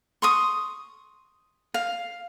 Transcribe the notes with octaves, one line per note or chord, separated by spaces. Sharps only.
C6 C#6 D#6
F5